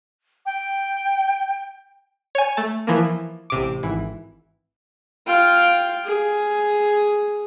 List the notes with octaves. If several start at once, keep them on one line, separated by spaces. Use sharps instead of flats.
G5
C#5 G#5
A3 A5
E3 F3 A#3
A1 C3 D6
G#1 E3
F4 G5
G#4